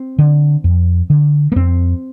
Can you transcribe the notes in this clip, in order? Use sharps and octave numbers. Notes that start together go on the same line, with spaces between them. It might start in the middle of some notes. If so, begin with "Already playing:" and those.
Already playing: C4
D3
F2
D3
A#3
F2 C4